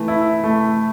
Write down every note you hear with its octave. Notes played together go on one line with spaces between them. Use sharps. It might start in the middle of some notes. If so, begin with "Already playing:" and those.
Already playing: E3 A3
E4
A3